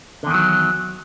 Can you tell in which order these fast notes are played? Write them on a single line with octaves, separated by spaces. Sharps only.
D3 E2 D#3 F#3